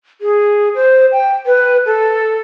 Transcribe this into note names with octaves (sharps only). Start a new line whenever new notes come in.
G#4
C5
G5
B4
A4